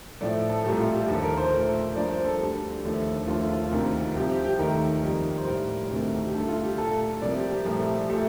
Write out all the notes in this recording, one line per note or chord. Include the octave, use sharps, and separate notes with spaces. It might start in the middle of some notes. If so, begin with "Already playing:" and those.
A2 F3 A3 D5
A4
C2 A#2 A3 G4
F4
G4
D#2 D3 F3 A#3 A4
A#4
C5
A#2 A3
G2 F3 A#3 D5
C5
A4
D2 D3 G3
D#2 D3 F3 A3
D#2 D3 F3 A3 F4
F4
D2 C3 D#3 A#3
C2 C3 F3 G4
G4
G4
D#2 D#3 A3 A#4
F2 D#3 G3 A#3
C5
A2 G3 A#3 A#4
D2 C3 D#3 A3
G4
G2 D3 A3 A4
F4
G4
A#2 A3 A4
C2 C3 F3 A#3 D5
G4
G4
C2 A#2 F3 A3
A#2 A3 G4